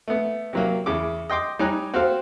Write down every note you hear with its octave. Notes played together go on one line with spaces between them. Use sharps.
A3 B3
C3 F#3 A#3
E2 C#3 D6
D#5 G5 C6 D6
G3 D#4 C#5 G#5 A#5 F#6
C4 F#4 G4 A4 C5 F5